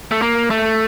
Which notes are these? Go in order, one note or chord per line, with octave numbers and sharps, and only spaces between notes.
A3
A#3
A3